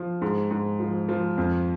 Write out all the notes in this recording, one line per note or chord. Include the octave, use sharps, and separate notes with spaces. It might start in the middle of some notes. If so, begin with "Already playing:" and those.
Already playing: F3
G#2
G#2
F3
F3
F2